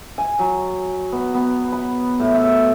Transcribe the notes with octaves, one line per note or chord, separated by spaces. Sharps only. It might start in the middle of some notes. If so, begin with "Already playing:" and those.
G#5
F#3
B3
B3
B5
A2
E5